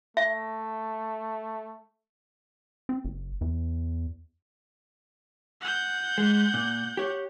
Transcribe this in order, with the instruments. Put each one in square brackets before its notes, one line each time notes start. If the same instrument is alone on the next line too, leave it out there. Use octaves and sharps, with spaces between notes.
[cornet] A3 [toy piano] E5
[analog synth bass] C4
F#1
E2
[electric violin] F#5 G6
[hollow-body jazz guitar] G#3
A#2
G4 C#5